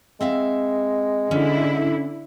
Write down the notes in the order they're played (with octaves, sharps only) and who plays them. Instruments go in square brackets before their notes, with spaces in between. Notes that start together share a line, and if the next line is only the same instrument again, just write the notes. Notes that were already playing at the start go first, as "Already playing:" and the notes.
[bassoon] G#3 [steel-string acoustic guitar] C4 E5 F5
[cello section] D3 E4 [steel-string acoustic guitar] C#4